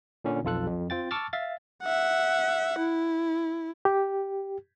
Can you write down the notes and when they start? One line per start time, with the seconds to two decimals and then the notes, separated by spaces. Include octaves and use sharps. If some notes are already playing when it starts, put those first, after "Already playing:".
0.24 A#2 D3 C#4
0.44 B1 F2 F4 A4 F#6
0.66 F2
0.90 C4 F4 G5 A6
1.11 A5 C#6 D6 E6 F6 A6
1.33 E5 F5 A6
1.84 E5 F#5
2.78 E4
3.85 G4